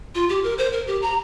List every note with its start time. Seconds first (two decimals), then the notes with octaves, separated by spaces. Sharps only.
0.15 F4
0.29 G4
0.44 A#4
0.58 C5
0.72 A#4
0.87 G4
1.02 A#5